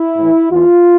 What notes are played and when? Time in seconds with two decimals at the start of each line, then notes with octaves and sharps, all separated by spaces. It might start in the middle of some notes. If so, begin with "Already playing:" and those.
Already playing: E4
0.15 A2 E3
0.50 E2 E3 F4